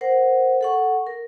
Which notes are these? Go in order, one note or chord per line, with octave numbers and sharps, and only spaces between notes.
A#4 C5 F#5
A4 F#5 C#6
A#4